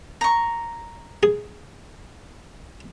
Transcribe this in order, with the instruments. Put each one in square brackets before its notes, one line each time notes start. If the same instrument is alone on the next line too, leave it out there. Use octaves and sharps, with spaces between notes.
[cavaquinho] A#5 C#6
[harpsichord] G#4